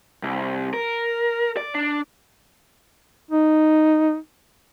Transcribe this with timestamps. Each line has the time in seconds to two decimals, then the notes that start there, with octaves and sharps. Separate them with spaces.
0.23 C2
0.74 A#4
1.57 D5
1.75 D4
3.31 D#4